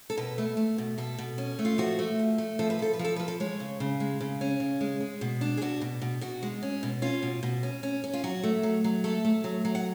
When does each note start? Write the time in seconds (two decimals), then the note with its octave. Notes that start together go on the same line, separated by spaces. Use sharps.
0.10 A4
0.18 B2 B4
0.38 A3
0.57 A3
0.78 B2
0.98 B2 A4
1.18 B2
1.38 C#4
1.59 A3
1.65 F4
1.78 F3 F#4
1.99 A3
2.19 F3
2.38 A3
2.59 F3 A4
2.70 B4
2.79 F3 A4
2.93 B4
2.99 F3
3.04 A4
3.16 F3 B4
3.28 A4
3.40 G#3 C#5
3.60 C#3
3.80 C#3
4.00 G#3
4.21 C#3
4.41 C#4
4.60 C#3
4.81 G#3
5.00 G#3
5.21 B2
5.41 D4
5.57 G#4
5.62 B2 F#4
5.81 B2
6.01 B2
6.21 B2 F#4
6.43 G#3
6.62 C#4
6.83 B2
7.02 C#4 F4
7.23 B2
7.43 B2
7.63 C#4
7.83 C#4
8.04 C#4
8.14 F4
8.24 F#3 F#4
8.44 A3
8.63 F#3
8.84 F#3
9.04 A3 A4
9.25 A3
9.44 F#3
9.65 F#3
9.75 F#5